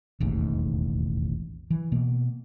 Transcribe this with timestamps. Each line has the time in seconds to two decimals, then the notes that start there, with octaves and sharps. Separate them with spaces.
0.20 E1 A1 D#2 G#2
1.70 E3
1.92 B2 A#3